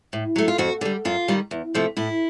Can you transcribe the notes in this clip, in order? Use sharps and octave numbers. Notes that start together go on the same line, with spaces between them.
A2
F#3 A3
F4
F2 F#4
D3 G3
F#2 F4
D#3 G3
E2
C3 F3 A3
A2 E4